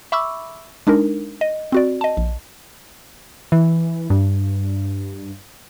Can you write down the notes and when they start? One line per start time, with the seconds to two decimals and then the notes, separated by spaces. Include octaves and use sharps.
0.12 E5 B5 C#6 D6 E6
0.87 G#3 D4 D#4 A#4
1.41 D#5
1.72 C4 F#4 D5
2.01 D#5 A5
2.17 A#1
3.52 E3
4.10 G2